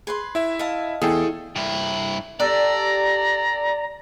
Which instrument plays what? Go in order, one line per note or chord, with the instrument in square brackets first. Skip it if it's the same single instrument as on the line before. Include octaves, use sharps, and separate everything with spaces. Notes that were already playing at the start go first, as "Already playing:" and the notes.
[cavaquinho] G#4 B4 C6
[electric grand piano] E4 E5
[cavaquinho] D#5 F5 A5
[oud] E2 [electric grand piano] G#4 A4 G5
[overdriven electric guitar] G2 E4
[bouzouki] D4 G4 A4 [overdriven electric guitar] D5 [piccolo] A#5